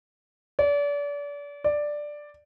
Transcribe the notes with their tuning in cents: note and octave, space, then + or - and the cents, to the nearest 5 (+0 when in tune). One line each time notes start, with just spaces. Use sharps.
D5 -35
D5 +5